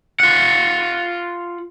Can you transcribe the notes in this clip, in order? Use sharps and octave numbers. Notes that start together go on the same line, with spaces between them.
F4 F#5